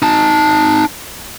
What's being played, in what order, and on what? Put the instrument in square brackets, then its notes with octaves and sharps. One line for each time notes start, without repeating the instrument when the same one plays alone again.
[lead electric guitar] D#4 A5